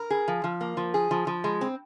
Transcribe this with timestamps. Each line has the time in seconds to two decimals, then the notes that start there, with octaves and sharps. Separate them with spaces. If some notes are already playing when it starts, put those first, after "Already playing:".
Already playing: A#4
0.10 G#4
0.28 F3
0.44 F3
0.61 A#3
0.77 F3
0.94 G#4
1.11 F3
1.27 F3
1.44 G#3
1.61 C4